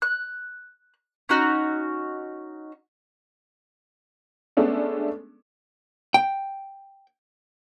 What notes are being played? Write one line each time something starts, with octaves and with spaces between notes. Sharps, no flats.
F#6
C#4 D#4 F#4
G#3 A3 B3 C#4 D4 A4
G5